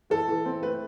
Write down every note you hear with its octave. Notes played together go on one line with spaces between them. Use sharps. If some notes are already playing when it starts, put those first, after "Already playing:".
E3 A4
E3
C4
A3 B4